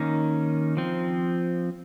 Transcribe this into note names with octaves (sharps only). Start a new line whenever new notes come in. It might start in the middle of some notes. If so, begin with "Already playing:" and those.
Already playing: D#3 A#3 C#4 D#4
F3 C4